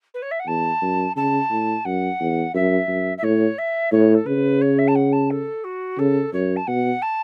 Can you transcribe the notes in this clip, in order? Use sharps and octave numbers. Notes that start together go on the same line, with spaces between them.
B4
C#5
E5
F#5
E2 A5
F#2
C#3 A5
A2
F#2 F#5
E2
F#2 E5
F#2
E5
A2 C#5
E5
A2 C#5
A4
C#3 B4
C#5
E5
A5
F#5
A5
A4
F#4
C#3 A4
F#2 C#5
A5
B2 F#5
A5